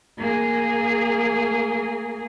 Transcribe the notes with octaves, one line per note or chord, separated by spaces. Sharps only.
A#3 G#4